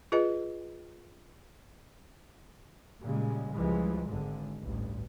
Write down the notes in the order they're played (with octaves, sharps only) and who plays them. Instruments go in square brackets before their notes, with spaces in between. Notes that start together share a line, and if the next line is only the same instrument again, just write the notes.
[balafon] F4 G#4 B4 D#5
[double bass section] A#2 C#3 G3 G#3
C#2 E3 F3 G3 G#3
G#1 G#2 D3
A1 D2 G2